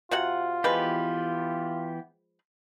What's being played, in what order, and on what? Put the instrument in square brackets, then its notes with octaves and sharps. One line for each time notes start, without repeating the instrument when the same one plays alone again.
[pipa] C3 F#4 F#5 [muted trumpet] F4
[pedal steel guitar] E3 B3 G4 [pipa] F3 G#3 B4